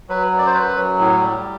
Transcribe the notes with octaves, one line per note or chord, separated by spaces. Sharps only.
F#3 B4
F#2
D5
C5
F#2 B4
F#3
A2
G3